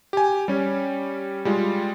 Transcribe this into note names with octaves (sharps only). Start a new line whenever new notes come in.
G4 G#5
G3 C#4
G3 G#3 F4